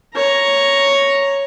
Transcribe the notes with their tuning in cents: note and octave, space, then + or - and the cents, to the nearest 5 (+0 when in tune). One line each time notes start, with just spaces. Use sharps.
C#5 +0 A#5 +0